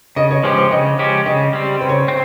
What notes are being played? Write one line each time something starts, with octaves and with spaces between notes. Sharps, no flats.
C#3 D#5
C#5
F3 G#3 C#4 G4 C5
C5
C#3 D#5
F3 G#3 C#4 G4
C#3 D#5
G3 C4
C#3 C5
C#5
C5
C4